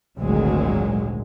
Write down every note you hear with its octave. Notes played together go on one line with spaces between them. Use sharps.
G#1 D2 A#2 F#3 G#3